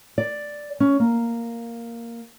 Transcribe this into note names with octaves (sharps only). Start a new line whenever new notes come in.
D5
C#4
A#3